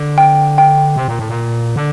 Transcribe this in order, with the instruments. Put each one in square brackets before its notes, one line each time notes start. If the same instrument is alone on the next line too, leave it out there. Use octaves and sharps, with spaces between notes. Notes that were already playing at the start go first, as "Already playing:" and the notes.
Already playing: [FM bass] D3
[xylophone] G5
G5
[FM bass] C3
A#2
A2
A#2
D3